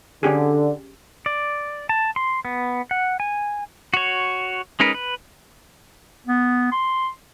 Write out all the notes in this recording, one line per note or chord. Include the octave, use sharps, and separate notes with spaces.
D3 C#4 G4 G#4
D5
A5
C6
B3
F#5
G#5
F#4 C#5
G#3 C#4 D#4 A#4 B4
B4
B3
C6